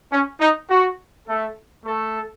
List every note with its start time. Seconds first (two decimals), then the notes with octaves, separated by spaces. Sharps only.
0.11 C#4
0.40 D#4
0.69 F#4
1.28 A3 A4
1.84 A3 A4